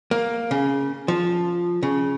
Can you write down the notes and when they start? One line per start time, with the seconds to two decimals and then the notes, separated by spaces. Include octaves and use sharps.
0.11 A#3
0.51 C#3
1.08 F3
1.83 C#3